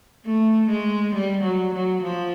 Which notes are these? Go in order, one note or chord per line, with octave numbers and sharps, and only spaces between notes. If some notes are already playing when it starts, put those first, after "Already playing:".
A3
G#3
G3
F#3
F#3
F3